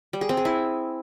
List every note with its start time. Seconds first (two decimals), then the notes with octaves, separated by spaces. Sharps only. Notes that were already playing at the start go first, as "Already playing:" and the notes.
0.13 G3
0.21 G#4
0.29 C4
0.37 G#4
0.45 E4